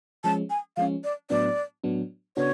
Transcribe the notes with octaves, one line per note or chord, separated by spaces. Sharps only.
F3 G#3 C#4 A5
G#5
F3 G#3 C#4 F5
D5
A2 F#3 B3 D4 D5
A2 F#3 B3 D4
C#3 B3 D4 F#4 C#5